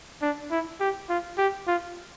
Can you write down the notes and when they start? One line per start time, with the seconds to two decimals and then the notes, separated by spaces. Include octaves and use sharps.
0.22 D4
0.51 E4
0.80 G4
1.09 F4
1.38 G4
1.67 F4